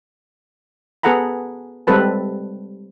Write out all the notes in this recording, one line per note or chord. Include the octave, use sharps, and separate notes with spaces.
B3 G#4 A4 F#5 A#5 B5
G3 G#3 C4 A4 B4 A5